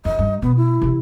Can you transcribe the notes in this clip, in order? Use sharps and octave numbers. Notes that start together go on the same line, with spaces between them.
F2 D#5
G2
B2 B3
E4
C3 E3